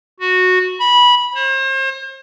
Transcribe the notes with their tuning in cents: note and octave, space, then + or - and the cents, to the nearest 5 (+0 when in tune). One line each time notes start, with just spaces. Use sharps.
F#4 -10
B5 -20
C5 +40